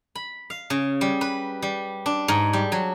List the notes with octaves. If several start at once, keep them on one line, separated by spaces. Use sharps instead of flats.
B5
F5
C#3
G3
B4
G3
D4
G#2
G3
F#3